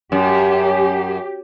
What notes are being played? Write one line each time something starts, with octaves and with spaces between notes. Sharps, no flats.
F#2 G4